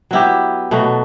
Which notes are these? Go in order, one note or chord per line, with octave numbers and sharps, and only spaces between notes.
F#3 B3 E4 G4
B2 F#3 A3